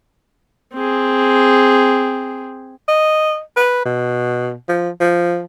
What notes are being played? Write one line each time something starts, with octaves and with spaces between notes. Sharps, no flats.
C4 G#4
D#5
B4
B2
F3
F3